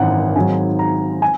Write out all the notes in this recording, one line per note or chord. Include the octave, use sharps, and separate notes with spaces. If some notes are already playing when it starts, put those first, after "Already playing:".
Already playing: G#1 F#2 E3 F#5
G#1 G#2 F#3 G#5
A#5
G#5